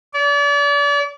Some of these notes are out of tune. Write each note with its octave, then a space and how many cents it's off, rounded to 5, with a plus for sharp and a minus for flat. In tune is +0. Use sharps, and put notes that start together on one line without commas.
D5 -35